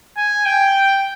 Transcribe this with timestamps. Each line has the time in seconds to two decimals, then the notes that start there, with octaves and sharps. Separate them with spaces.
0.17 G#5
0.46 G5